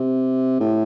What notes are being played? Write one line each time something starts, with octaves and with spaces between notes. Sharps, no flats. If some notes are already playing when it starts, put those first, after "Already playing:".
Already playing: C3
A2